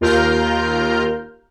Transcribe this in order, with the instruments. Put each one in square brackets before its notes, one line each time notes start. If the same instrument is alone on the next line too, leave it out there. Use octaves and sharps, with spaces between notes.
[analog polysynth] D#2 F4 A#4 A#5 F6 G6